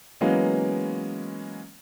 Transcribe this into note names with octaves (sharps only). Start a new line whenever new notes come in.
E3 F#3 G#3 A#3 B3 C#4